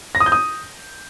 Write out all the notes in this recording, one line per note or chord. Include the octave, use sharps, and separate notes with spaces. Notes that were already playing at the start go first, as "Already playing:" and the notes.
A#6
D#6
G6
D#6